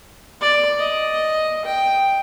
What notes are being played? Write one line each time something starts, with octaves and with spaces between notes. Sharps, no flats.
D5
D#5
G5